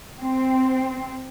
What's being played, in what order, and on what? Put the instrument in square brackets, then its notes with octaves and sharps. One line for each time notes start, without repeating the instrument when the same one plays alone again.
[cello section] C4